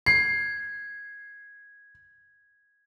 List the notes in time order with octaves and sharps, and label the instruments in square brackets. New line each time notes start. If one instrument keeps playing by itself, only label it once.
[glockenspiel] G#6 [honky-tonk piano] C7